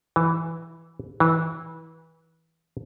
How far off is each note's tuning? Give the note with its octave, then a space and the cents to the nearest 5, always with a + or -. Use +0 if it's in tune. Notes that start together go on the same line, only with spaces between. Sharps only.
E3 +5
E3 -20